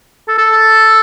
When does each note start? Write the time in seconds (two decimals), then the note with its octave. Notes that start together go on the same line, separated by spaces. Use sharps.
0.28 A4
0.38 A4